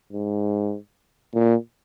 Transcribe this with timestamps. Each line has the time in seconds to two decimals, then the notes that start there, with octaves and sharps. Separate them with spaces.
0.13 G#2
1.34 A#2